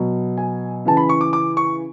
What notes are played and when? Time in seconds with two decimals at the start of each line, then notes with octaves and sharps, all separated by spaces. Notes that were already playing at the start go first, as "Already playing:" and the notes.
Already playing: B2 F#3
0.37 G#5
0.85 C#3 E3 A5
0.97 B5
1.09 C#6
1.21 D6
1.33 D6
1.57 C#6